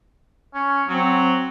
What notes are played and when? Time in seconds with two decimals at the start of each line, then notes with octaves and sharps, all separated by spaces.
0.54 C#4
0.89 F#3 C4